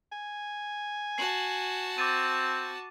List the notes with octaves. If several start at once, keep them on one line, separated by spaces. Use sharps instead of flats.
G#5
F#4 A5 C7 F#7
C4 D6 A6 D#7